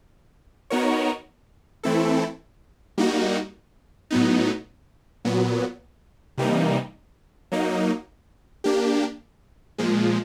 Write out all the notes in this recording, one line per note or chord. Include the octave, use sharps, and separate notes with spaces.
B3 D#4 F#4 A#4 C#5
E3 A3 C4 E4 A4
G3 A#3 D#4 F#4
A2 F#3 B3 D#4
A#2 F#3 B3
C3 E3 G3 A#3 D#4
F#3 A#3 D#4
A#3 D4 G4
A#2 F3 G#3